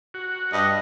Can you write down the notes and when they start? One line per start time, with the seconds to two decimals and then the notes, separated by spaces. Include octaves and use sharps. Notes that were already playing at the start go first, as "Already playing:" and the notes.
0.14 F#4
0.53 G2 D#5